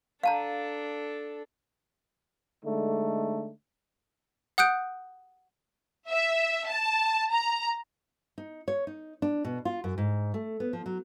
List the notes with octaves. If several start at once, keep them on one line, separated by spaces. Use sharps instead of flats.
D4 A4 F5 A5 A#5
D3 G#3 A3 D#4
F#5 D#6 F#6 G6 D7
E5
A5
A#5
D#4
C#5
D#4
D4
B2
F4
F#2
G#2
A3
B3
F3
F#3